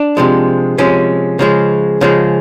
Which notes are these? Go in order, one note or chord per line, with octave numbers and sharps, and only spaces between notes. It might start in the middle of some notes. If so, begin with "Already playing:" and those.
Already playing: D4
C3 F3 G#3
C3 F3 G#3 C#4
C#3 F3 G#3
C#3 F3 G#3